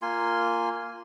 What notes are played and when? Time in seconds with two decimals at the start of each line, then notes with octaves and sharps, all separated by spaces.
0.02 A#3 F4 G#5 C6